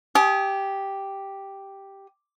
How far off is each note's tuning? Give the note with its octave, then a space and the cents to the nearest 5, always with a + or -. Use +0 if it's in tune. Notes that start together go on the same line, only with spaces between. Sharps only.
G4 +0 G#5 +40 D#6 +15